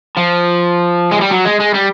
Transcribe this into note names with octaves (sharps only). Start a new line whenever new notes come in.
F3
G#3
G3
F#3
G#3
G#3
G3